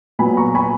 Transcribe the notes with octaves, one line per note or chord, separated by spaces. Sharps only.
A#2 F#3 B3 G#5 B5
A#5 C#6
G#5 B5